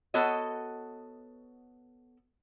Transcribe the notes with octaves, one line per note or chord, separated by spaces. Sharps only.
B3 F#4 A4 C#5 D#5